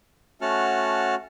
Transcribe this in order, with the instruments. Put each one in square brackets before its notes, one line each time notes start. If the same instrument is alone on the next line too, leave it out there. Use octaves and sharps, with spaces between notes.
[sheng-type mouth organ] A3 C#4 F#4 F#5 A5 F6